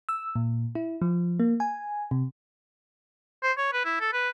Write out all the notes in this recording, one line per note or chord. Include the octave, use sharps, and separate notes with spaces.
E6
A#2
E4
F3
A#3
G#5
C3
C5
C#5
B4
E4
A4
B4